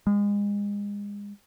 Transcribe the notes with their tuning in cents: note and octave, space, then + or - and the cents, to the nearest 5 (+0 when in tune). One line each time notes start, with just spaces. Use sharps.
G#3 -30